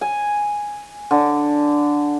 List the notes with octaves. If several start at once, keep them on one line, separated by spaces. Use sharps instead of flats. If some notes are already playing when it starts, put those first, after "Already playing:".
G#5
D3